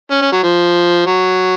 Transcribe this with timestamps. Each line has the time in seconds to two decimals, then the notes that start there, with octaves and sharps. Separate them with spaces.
0.11 C#4
0.22 C#4
0.32 F#3
0.43 F3
1.07 F#3